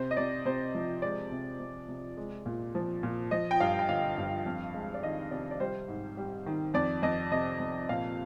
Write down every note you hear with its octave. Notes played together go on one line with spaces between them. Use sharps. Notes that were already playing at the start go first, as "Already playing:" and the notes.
Already playing: C3 C5
D#5
C3 D5
C3 C5
F3
G#3 D5
C3
C3
C3
G#3
A#2
F3
A#2
F3 D#5
G5
G2 F5
G5
D3 F5
G2
F2
G#3
D5
D#3 D#5
C3 D5
D5
G3 C5
G#2
G3
D#3
F2 D5
F2 D#5
C3 D#5
F2
A#2 F5